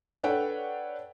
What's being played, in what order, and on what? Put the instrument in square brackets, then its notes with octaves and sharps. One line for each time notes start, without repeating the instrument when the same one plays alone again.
[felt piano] D4 A4 B4 C#5 F#5 G5